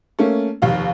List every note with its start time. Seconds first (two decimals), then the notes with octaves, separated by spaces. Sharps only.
0.19 A3 A#3 C#4
0.62 F1 D#2 F5